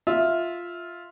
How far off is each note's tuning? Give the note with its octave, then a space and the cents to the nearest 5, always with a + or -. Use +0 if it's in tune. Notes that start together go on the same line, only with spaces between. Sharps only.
F4 +0 E5 -10